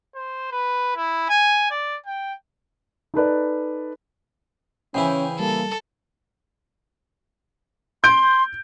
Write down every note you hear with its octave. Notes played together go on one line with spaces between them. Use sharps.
C5
B4
E4
G#5
D5
G5
D#4 A4 B4 D5
C#3 E3 C#4 E4 C5 G5
G3 A#3 A4
C6 G6 D7